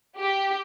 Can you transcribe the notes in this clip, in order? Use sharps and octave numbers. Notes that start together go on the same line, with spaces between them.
G4